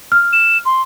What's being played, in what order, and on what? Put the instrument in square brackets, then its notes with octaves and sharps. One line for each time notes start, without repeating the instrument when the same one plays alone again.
[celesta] F6
[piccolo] E7
C6